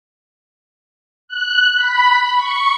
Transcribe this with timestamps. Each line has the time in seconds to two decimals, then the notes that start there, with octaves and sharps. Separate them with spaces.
1.28 F#6
1.76 B5
2.35 C#6